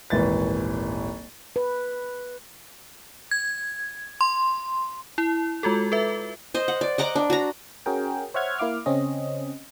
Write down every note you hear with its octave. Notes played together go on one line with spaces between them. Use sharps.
D#1 G#1 E3 A6
B4
G#6
C6
E4
G#3 F4 F#4 A4
A4 B4 E5
C5 D#5
F#5
D5
D#5 F#5 A#5 D6
D4
F#4 A#5
C#4 F#4 G#4 A#4 G5
C5 C#5 E5 F#5 F6 G#6
A#3 E4 F5 D6 F6
C#3 C4 C#4 D#5